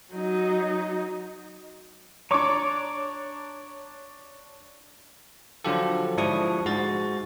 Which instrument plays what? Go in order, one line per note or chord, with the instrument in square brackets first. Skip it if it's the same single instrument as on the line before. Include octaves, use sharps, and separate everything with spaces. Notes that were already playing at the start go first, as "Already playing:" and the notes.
[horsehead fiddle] F#3 D#4
[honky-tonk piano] D4 C#5 [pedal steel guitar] A#5 C#6 D6
[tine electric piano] D3 F3 F#3 F4 G4 A4
G#2 F3 D4 E4 C#6 D#6
G#2 F#4 A6